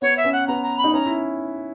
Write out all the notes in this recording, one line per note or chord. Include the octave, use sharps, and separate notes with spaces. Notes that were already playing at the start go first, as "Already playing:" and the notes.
B3 C#5
E5
C#4
F#5
B3 A#5
A#5
B5
D#4
C#4 A#5
E4